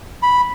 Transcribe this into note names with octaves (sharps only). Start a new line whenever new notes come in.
B5